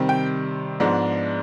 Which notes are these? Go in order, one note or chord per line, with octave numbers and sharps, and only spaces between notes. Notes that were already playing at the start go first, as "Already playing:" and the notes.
Already playing: C3 D#3 G3 C4
G5
G#2 F3 G#3 B3 D4